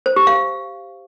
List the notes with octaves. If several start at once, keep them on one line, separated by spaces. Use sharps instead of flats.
C5
G4
F5